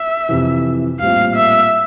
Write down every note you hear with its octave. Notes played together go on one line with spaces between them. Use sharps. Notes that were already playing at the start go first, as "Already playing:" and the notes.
Already playing: E5
F2 C3 E3
A#1 A2 G3 C4 F4 F5
E5